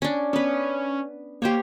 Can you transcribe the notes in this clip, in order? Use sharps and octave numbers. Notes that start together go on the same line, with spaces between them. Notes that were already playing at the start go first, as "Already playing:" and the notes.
C#4 D4
B3 C#4 B4
A#3 G4 C5 C#5